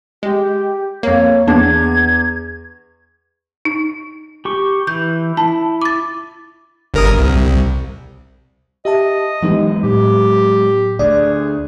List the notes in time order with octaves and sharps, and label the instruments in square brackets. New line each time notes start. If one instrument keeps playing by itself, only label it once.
[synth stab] G#3 [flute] G4
[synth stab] F2 A#3 [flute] C#5
[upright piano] E2 [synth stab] D4 [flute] G#6
[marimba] D#4
[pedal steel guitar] G4 C#6
[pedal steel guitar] E3 [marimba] G6
[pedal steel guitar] E4 [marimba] A5
[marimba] D6 A6
[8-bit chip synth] G1 A#4 D#6
C2
[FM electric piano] G4 E5 A5 [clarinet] D#5
[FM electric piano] E3 D#4 G4 [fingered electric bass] F#3 G#3 B3
[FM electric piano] A2 [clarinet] G4
[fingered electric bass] D2 [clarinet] G#4 [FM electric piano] D5